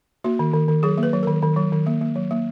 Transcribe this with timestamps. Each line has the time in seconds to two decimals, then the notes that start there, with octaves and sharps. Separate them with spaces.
0.24 A#3 F#4
0.39 D#3
0.54 D#3
0.68 D#3
0.83 F#3 G#4
0.97 A#3
1.03 B4
1.13 F#3
1.23 D#3 A#4
1.42 D#3
1.57 F#3
1.72 D#3
1.86 A#3
2.01 A#3
2.16 F#3
2.31 A#3